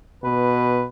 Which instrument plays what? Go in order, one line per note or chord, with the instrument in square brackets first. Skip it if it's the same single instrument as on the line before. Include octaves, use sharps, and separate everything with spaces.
[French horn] B2 [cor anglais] B4